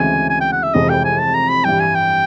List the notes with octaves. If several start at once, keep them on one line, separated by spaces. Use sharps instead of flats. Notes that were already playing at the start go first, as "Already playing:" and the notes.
Already playing: D2 C#3 E3 G#3 C4 G#5
G#5
G5
F#5
E5
F1 F2 C3 E3 G#3 D#5
G5
G#5
A5
A#5
B5
G2 E3 G3 G5
G#5
G5